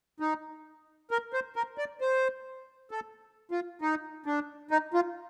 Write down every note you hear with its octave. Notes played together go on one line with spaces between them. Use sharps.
D#4
A#4
C5
A#4
D5
C5
A4
F4
D#4
D4
D#4
F4